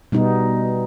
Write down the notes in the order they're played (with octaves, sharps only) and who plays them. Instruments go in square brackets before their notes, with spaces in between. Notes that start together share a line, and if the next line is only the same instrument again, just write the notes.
[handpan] B2 G3 B3 D#4